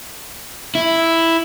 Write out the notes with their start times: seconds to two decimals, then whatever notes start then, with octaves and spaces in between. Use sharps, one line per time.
0.75 E4